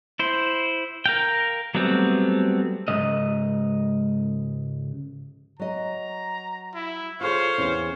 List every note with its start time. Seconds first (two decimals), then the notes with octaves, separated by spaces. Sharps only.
0.19 E4 C5
1.06 A#4 F5 G5
1.75 F#3 G3 A3 B3 C4
2.88 C#2 G#2 D#5
5.59 F#3 D#5 A#5
6.75 E4
7.21 F4 G#4 A4 C5 C#5 F5
7.58 E2 C#4 E4